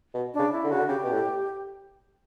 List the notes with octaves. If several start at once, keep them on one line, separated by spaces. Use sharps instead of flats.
B2
C#3 D4
E4
D3
C#3 F#4
D3
C#3 G4
B2
A2